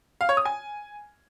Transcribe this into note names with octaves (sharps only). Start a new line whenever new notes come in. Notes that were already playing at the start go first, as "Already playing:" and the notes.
F5
C#5
D#6
G#5